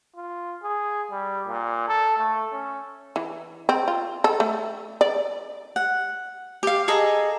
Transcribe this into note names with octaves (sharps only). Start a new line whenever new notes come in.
F4
G#4
G3
A#2
A4
A3
C#4
E3
C4
F4
A4
A3
D5
F#5
G4 F5
G#4 A4 D#5 A#5